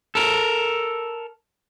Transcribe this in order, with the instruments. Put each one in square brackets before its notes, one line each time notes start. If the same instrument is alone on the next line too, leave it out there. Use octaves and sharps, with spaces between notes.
[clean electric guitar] A4 A#4